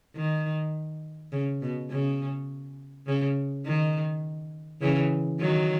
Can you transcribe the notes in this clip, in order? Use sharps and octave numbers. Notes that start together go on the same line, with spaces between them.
D#3
C#3
B2
C#3
C#3
D#3
C#3 E3
D#3 F#3